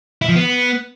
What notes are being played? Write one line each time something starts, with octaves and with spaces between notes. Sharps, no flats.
E4
F3
B3